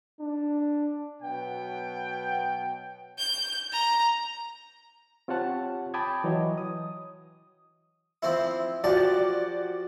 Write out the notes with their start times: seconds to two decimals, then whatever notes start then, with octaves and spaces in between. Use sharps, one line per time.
0.20 D4
1.22 B2 F#3 B3 G5
3.18 G6
3.72 A#5
5.28 C4 F4 G4 C#5 F#5 A5
5.94 G5 A5 B5 D6 D#6 G#6
6.24 E3 F#3 C#5 D#5
6.58 D#6
8.22 F3 C4 E4
8.84 F3 F#4 G4 D5 A5